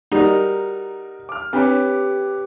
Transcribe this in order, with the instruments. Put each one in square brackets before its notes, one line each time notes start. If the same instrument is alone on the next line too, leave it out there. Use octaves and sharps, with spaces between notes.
[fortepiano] G3 D#4 [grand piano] F#4 A#4
[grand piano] D6 F6
[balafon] C4 D4 [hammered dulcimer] G4 [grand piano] B4 C#5